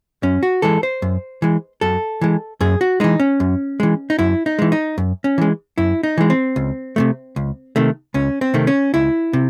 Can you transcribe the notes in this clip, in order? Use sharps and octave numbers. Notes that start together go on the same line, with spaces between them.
F#2 C#4
F#4
E3 G#3 A4
C5
F#2
E3 G#3
F#2 A4
E3 G#3
F#2 G#4
F#4
E3 G#3 D#4
C#4
F#2
E3 G#3
D#4
F#2 E4
D#4
E3 G#3
D#4
F#2
C#4
E3 G#3
F#2 E4
D#4
E3 G#3
C4
C#2
C3 D#3 A3
C#2
C3 D#3 A3
C#2 C#4
C4
C3 D#3 A3
C#4
C#2 E4
C3